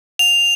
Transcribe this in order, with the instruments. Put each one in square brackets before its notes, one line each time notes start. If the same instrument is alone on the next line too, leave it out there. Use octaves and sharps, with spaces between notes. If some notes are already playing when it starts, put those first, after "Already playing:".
[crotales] F7